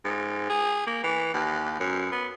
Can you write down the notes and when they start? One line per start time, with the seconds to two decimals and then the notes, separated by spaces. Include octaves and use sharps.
0.05 G#2
0.50 G#4
0.87 A#3
1.04 E3
1.34 D#2
1.80 F#2
2.12 B3